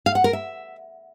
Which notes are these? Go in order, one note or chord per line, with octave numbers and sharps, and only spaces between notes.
F5
F#5
A#4
E5